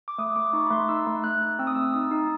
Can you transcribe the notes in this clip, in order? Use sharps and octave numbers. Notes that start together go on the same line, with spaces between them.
D6
A3 D#6
A3 D6
D#4 C#6
B5
A3 C6
D#4 E6
A3
A3 F#6
D#4
C4 E6
D#6
A3 E6
D#4 D#6
D#4